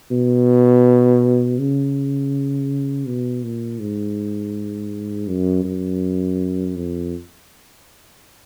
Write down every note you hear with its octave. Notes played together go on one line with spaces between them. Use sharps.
B2
C#3
B2
A#2
G#2
F#2
F#2
F2